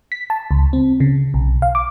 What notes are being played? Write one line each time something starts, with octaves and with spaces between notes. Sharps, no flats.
B6
A5
C#2
C4
C#3
B1
F5
D6